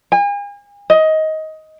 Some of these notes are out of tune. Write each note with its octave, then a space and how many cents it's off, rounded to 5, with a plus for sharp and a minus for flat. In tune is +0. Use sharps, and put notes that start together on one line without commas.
G#5 -40
D#5 +15